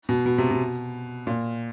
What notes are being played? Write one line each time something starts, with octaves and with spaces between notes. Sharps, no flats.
B2
B2
C3
B2
A#2